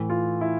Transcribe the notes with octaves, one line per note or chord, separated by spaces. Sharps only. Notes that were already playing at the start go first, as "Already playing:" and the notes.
Already playing: A2 E3
F4
E4